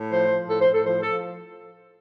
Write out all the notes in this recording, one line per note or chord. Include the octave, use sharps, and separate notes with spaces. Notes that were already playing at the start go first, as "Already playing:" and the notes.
Already playing: A2
F3 C5
F3
A2 A4
C5
A2
A4
F3 C5
F3 A4